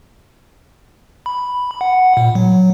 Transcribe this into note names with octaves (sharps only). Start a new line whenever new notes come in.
B5
F#5
A#2
F#3